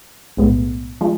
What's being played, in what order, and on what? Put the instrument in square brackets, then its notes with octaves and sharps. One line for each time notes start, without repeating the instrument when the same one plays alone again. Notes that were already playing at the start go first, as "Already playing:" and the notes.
[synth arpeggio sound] B1 A2 G#3 B3
F3 G#3